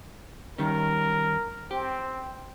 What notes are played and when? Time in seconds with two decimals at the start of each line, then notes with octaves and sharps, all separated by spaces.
0.58 D#3 G3 C#4 A#4
1.71 C4 G4